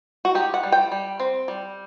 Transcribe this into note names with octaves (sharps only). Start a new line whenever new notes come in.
F#4
D#4 G4
F#5
G3
G5
G3
C4
G3